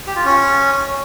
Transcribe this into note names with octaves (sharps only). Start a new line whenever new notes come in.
G4
F4
C#4